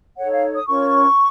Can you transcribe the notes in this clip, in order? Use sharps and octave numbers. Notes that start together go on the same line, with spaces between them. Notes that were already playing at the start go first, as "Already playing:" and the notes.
D#4 A4 C#5 F#5
F5
D#6
C#4 F4 A#4 C#5 C#6